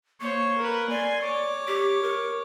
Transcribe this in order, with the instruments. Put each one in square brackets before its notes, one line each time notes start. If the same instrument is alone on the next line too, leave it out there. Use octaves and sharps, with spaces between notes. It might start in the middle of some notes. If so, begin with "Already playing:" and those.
[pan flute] A#3 [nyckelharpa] C5 C#5
[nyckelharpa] A#4 B4
[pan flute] D5 [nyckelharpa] G#5 C6
[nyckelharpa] C#5 D6
[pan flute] G4
A#4